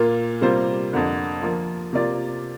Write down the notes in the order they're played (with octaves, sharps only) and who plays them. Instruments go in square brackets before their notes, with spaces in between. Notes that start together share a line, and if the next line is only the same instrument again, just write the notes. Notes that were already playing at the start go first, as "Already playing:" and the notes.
Already playing: [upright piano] A#2 A#3 F4
C3 G3 A#3 F4 C5
F2 D3 A#3
F3 A#3 F4
C3 A#3 F4 D5